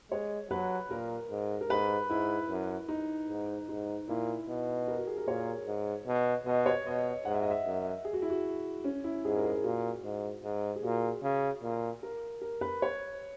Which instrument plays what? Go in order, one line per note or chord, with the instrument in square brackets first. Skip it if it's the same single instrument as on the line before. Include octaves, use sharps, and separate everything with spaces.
[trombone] G#3 [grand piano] C#5
[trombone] F#3 [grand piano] B4
[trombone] A#2 [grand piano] A#4
[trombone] G#2
[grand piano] A#4
[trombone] G#2 [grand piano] B4
[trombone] G#2 [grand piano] E4
[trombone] F#2
[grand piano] D#4
[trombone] G#2
[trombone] G#2 [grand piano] D#4
[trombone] A#2 [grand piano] E4
[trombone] B2
[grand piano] A#4
F#4
G#4
A#4
[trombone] A#2 [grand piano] C#5
[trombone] G#2
B2
[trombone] B2 [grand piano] D#5
[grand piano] C#5
[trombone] B2 [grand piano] D#5
[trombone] G#2 [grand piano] F#5
[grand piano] E5
D#5
E5
[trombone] F#2
[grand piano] G#4
F#4
E4
F#4
C#4
E4
[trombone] G#2 [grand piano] G#4
[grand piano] A#4
G#4
[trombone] A#2 [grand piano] F#4
[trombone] G#2
G#2
[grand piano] G#4
[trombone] A#2 [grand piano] F#4
[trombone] C#3
A#2
[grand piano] A#4
A#4
B4
C#5